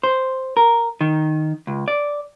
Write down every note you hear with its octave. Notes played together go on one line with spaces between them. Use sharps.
C5
A#4
D#3
C#2
D5